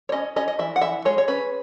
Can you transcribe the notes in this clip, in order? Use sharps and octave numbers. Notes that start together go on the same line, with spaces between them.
C#5
C#4 D#5
C#4 D#5
D#5
E3 E5
F#5
E3 E5
G#3 C#5
C#5
C#4 B4